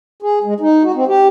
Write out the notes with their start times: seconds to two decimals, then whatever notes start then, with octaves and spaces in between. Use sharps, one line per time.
0.22 G#4
0.44 G#3
0.60 D#4
0.83 F#4
0.95 C4
1.07 G4